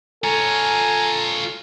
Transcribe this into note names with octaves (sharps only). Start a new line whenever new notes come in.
F4 A4 C#5 G#5 A#5